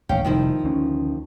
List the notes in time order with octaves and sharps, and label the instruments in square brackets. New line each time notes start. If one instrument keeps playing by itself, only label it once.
[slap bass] D#1 A1 A2 [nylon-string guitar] C#4 F5 G5
[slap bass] F1 G3 [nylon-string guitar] D#3 F3 E4
[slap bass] D2 C#4